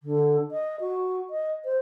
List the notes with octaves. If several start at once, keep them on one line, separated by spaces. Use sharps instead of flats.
D3
D#5
F#4
D#5
C5